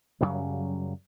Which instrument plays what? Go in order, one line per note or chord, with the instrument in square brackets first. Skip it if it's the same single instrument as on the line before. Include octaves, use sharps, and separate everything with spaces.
[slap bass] F#2 C#3 F#3 G3